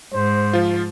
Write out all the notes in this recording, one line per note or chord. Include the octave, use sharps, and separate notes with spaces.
G#2 C5
F3 F4